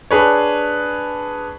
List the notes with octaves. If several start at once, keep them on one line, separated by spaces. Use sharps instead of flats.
D4 G#4 B4 C#5